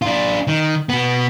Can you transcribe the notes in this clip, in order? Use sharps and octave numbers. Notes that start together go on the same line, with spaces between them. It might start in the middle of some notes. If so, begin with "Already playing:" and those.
D4 F4
D#3
B2 B3